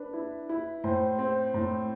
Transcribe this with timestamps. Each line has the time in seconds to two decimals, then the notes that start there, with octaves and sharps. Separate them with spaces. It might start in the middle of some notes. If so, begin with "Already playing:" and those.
Already playing: D4 B4
0.13 E4
0.49 E4
0.84 A2 C5
1.19 C4
1.54 A2